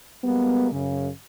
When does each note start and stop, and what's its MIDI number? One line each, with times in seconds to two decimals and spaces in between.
0.24 0.69 55
0.24 0.69 56
0.24 0.69 58
0.24 0.69 59
0.72 1.08 42
0.72 1.08 49